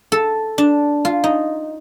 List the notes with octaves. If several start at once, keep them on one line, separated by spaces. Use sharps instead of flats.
A4
D4
F4
D#4